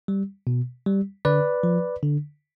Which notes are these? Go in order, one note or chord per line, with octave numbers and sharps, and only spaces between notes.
G3
B2
G3
D3 B4 D5
F3
D3